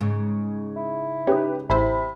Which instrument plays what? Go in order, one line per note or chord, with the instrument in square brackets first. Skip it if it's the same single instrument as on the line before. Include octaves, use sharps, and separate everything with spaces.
[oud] G#2 C#3
[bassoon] E4
[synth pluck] C#4 D#4 [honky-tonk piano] G4 B4
[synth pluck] A1 E4 C5 [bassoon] C3 [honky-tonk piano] B5